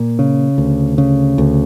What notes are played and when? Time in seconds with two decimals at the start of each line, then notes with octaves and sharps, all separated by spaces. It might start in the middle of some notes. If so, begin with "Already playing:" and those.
Already playing: A#2
0.19 C#3
0.58 D2
0.98 C#3
1.38 D2